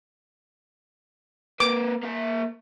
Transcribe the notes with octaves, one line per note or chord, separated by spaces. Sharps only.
A#3 B4 D6
A#3 E5